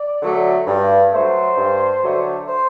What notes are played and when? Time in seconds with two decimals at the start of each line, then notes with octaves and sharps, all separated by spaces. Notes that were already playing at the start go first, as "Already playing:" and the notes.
Already playing: D5
0.21 D3 F#3 A3
0.66 G2
1.12 D3 F#3 A3 C5
1.57 G2
2.03 D3 F#3 A3
2.48 C5